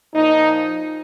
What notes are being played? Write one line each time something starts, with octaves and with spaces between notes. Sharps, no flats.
A#2 F3 D#4